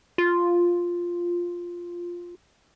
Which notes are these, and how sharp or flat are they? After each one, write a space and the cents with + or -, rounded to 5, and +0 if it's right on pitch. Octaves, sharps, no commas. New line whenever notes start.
F4 +0